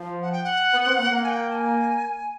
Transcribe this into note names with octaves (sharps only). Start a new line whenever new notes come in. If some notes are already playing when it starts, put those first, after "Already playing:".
Already playing: F3
F#5
G5
F#5
B3
C4
A#3
A#3
G#5
G5
A5
G#5